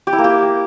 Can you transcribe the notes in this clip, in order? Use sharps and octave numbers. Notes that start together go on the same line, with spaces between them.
G4
E4
A#3
G4